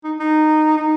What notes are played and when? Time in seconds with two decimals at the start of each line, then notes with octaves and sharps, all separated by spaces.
0.04 D#4
0.19 D#4
0.77 D#4